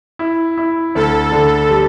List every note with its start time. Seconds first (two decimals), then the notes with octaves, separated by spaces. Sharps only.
0.19 E4
0.58 E4
0.95 D2 A4
1.32 D3
1.70 G3